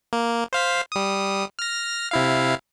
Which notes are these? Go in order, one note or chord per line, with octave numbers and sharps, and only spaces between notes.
A#3
C5 F5 B6
G3 D#6
F6 A#6
C3 E4 F5